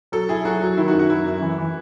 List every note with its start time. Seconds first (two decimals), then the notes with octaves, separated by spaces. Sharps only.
0.12 F#3 A4
0.29 E4 G#4
0.45 F#3 F#4
0.61 F#3
0.77 D#3 E4
0.88 F#4
0.93 F#2
0.99 F#4
1.10 F#2 E4
1.26 F#2
1.42 E3
1.58 E3